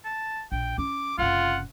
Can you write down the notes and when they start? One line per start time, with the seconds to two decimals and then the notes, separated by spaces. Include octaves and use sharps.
0.05 A5
0.52 A#1 G5
0.78 C#4 E4 D6
1.18 F#1 C3 F4 F#5